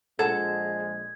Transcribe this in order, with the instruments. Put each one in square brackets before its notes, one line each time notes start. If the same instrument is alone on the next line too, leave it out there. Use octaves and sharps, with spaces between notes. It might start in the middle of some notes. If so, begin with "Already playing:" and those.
[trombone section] A#1 G#3 [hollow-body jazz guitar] A4 F#5 A5 [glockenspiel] G#6